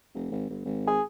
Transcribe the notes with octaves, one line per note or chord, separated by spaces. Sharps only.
F1
G#1
G1
G#1
G#4